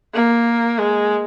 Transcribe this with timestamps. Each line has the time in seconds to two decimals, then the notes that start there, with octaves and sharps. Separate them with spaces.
0.14 A#3
0.79 G#3